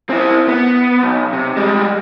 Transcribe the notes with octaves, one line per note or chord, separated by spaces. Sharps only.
C4 E4
B3
B1
C3
G3 G#3